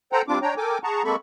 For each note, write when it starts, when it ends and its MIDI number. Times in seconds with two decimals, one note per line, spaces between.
0.12 0.22 69
0.12 0.22 72
0.12 0.22 78
0.12 0.22 79
0.12 0.22 82
0.28 0.39 55
0.28 0.39 60
0.28 0.39 62
0.28 0.39 65
0.28 0.39 86
0.42 0.54 62
0.42 0.54 73
0.42 0.54 79
0.42 0.54 82
0.57 0.78 69
0.57 0.78 70
0.57 0.78 79
0.57 0.78 80
0.57 0.78 86
0.84 1.03 68
0.84 1.03 78
0.84 1.03 81
0.84 1.03 82
0.84 1.03 85
1.04 1.16 56
1.04 1.16 58
1.04 1.16 60
1.04 1.16 69
1.04 1.16 83
1.04 1.16 85